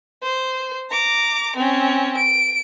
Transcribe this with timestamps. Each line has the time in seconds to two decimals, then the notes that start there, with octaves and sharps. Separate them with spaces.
0.23 C5
0.91 A#5 D6
1.56 C4 C#4
2.17 D7